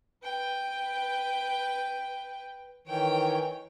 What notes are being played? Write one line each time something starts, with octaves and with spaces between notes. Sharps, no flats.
B4 G5
D#3 E3 C#5 G5